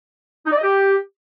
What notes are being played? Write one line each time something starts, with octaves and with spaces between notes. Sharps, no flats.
D#4
D5
D#5
G4